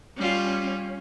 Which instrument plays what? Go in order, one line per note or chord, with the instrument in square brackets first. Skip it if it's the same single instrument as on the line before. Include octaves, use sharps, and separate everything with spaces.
[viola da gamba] G3 F4 [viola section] C#4